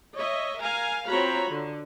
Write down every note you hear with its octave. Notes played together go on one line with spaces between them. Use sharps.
C#5 D#5 E5
A#4 F5 G#5 A#5
C4 F4 F#4 C#5 A#5 B5
D3